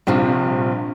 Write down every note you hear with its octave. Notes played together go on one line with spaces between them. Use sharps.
A#1 G2 C3 F3